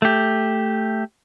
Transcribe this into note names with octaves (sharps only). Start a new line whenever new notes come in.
A3 G4